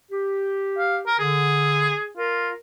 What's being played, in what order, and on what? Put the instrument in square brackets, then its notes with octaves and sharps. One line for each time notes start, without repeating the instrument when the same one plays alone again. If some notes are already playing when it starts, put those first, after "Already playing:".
[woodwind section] G4
[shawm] F5
A#4
[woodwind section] D3 [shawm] G#4
[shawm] F4 [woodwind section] A#4